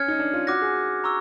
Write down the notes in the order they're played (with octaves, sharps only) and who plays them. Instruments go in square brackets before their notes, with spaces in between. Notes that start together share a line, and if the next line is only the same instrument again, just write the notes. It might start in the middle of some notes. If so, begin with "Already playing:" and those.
Already playing: [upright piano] C#4 [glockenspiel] F6 G#6 C#7
[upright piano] D#4
D4
F4
[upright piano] F#4 [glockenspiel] D6 F#6 A#6
[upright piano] G#4
[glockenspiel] A#5 C#6 E6